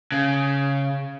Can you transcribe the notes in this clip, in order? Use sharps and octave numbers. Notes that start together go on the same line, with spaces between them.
C#3